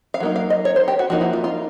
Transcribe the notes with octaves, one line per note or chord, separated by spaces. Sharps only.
F5
F#3 A#3 D#4
F5
D#5
C#5
C5
G4
F#4
F3 A#3 D#4 F#4
E4
F4
F4